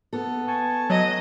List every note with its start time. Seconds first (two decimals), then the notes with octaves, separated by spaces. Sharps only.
0.13 B3 A4
0.48 G#5 A5 C#6
0.90 F#3 D#5